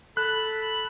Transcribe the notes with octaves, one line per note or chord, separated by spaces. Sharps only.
A4 B5 F#6